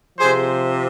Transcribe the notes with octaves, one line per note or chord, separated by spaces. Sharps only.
C3 F3 G#4 C5